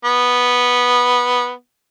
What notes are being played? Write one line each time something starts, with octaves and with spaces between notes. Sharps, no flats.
B3